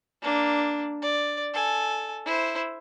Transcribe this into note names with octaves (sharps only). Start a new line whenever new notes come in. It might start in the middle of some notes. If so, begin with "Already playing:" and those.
A#3 D4
D5
A4 G#5
E4 C5